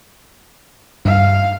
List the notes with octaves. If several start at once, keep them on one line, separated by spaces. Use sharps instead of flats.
G2 F5